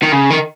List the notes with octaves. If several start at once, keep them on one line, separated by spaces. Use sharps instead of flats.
D#3
C#3
D#3